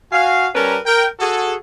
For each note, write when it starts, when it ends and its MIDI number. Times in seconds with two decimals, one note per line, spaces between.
0.12 0.48 66
0.12 0.48 77
0.12 0.48 80
0.55 0.77 55
0.55 0.77 61
0.55 0.77 70
0.55 0.77 71
0.55 0.77 81
0.55 0.77 82
0.86 1.06 70
0.86 1.06 79
1.20 1.56 66
1.20 1.56 68
1.20 1.56 69